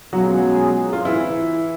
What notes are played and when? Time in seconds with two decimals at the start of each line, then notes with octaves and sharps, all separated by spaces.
0.13 B2 F#3 G#3 C#4 F4 F#4 G#4
0.93 F4
1.05 E3 E4